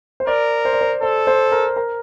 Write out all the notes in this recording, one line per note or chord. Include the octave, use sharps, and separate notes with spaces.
C5
A#4 D5
C5
D5
C5
A4 C5
C5
A#4
A#4